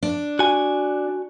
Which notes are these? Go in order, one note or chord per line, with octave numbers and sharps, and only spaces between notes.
D4
F#4 G#5